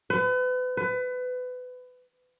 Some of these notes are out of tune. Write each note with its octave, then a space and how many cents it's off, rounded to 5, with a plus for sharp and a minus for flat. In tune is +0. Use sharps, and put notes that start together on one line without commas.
B4 +35
B4 +25